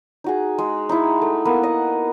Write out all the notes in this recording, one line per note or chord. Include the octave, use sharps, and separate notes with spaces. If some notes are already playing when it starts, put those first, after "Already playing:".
D#4 F#4 G#4
G#3
D#4 E4
A3
A#3 B3 B4
D#5 F#5